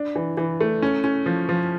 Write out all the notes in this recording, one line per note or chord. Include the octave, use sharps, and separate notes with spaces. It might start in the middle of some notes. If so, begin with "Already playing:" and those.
Already playing: D4
E3
E3
A3
C#4
C#4
F3
F3